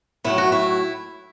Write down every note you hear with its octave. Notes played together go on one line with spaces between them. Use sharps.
A2 F#3 A3 E4
F#4
E4